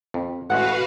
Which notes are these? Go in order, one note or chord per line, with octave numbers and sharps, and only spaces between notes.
F2
A1 G#3 A3 F#4 B4 F5 F#5